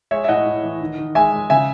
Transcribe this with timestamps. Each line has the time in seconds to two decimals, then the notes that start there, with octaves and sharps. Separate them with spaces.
0.11 G#3 C#5 E5
0.24 E5
0.28 A2 D#5 F#5
0.46 A2
0.63 E3
0.81 D#3
0.98 D#3
1.15 G#3 E5 G#5
1.32 G#3
1.50 C#3 E5 G#5